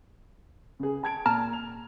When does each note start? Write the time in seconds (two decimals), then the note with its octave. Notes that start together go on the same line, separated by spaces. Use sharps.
0.80 C#3 G#4
1.03 A5 G#6 D7
1.26 A#2 A5 A#5 F6
1.53 F7